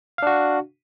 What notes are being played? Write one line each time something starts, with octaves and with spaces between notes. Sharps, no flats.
D4 F#4 F5